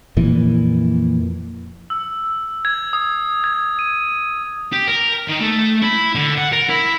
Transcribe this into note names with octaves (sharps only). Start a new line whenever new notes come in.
F2 A#2 E3
E6
G#6
D#6
G#6
D#7
G4
A#4
D#3
A3
E4
D3
F#5
A#4
E4